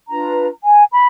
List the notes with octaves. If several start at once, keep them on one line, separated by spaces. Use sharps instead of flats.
D4 F4 B4 A#5
G#5
B5